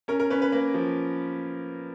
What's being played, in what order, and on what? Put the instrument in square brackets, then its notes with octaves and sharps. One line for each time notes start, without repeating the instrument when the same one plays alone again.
[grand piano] C#4 A#4
A#4
C#4 B4
B4
A#3 B4
F3